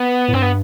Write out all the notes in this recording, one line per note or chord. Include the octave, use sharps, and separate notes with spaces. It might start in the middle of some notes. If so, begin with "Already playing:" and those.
Already playing: B3
A2
G2 C4
B3